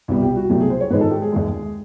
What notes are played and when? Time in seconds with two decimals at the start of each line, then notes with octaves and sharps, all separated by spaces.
0.08 C2 B2 G3
0.22 G4
0.36 F#4
0.50 C2 B2 F#3 A3 G4
0.60 G#4
0.70 C5
0.81 C#5
0.90 G#2 D#3 G#3 B4
1.01 A4
1.11 G4
1.22 G#4
1.32 D#2 D#3 G#3